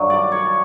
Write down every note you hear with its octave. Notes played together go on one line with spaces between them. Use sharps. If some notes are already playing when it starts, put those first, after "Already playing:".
Already playing: G2 D#3 F#3
D5
C#5